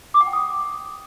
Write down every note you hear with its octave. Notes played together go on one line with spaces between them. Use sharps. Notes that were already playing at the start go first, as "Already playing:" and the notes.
D6
F#5
G5
D#6